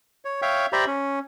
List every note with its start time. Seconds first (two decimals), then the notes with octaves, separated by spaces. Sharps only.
0.25 C#5
0.42 C#5 E5 F5 G5
0.73 G4 C5 D5 E5 A#5 B5
0.87 C#4